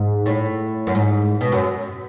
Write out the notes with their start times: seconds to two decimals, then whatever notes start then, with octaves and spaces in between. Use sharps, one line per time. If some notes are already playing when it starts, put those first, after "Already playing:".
Already playing: G#2
0.26 A2
0.87 F#2
0.95 G#2
1.41 B2
1.52 F#2 F#3